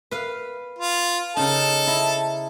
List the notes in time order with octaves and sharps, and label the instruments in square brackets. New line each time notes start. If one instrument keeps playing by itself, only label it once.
[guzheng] B4 F5
[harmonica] F4
[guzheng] C#3 D#4 [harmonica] A4 A5
[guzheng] E4 A#5